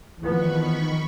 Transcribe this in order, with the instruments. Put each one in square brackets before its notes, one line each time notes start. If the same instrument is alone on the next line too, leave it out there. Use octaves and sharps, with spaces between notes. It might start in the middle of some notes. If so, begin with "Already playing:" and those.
[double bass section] E2 F3 B3 [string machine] D#3 B5 C#6